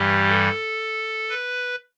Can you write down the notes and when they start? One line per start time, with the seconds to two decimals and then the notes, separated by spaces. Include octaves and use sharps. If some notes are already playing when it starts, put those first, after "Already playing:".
Already playing: G2 E3 G3 G4
0.29 A4
1.29 B4